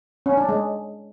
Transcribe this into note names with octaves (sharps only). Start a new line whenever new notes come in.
C#4
D4
G#3